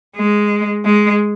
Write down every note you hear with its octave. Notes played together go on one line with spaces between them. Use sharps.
G#3
G#3